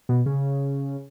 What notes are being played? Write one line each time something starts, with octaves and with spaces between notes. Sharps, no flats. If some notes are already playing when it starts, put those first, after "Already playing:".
B2
C#3